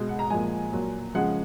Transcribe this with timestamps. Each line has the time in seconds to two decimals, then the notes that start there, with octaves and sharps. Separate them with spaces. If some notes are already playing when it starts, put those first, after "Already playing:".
Already playing: B2 G#3
0.09 F#5
0.19 A#5
0.30 A#2 F3 G#3 G#5
0.73 A#2 F#3
1.15 C#3 F3 G#3 F#5